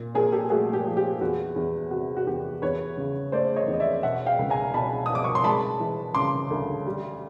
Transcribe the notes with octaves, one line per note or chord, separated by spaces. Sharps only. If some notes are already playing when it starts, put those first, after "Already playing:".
Already playing: A#2
A#2 G#4 A#4
G4 A4
A3 F#4 G#4
G4
F3
G4
E2 F#4
E2
C3 F#4
F#4
E2 G4
E2 B4 C#5
C#3
A3 C5 D5
C#5 D#5
E2
D#5
D5 E5
B2 E5 F#5
F5 G5
C#2
G#5 A#5
B2 A5 B5
B2 D#6
D6
C#6
C6
G#3 A5 B5
E3
C#3 C6 D6
D2
G3